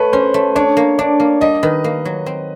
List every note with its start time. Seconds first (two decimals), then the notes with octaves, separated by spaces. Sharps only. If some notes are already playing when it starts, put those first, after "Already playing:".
Already playing: A3 B4 C#5
0.13 C#4 C5
0.34 A3
0.55 D4 C#5
0.77 A#3
0.98 D4 D5
1.20 A#3
1.41 G3 D#5
1.63 D#3 B4
1.84 A#3
2.05 F#3
2.26 C4